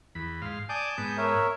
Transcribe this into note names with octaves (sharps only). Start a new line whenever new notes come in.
E2 B5
G#2 F5 C6
D5 G#5 A5 D#6 G6
G#2 B3
A#4 C#5 E5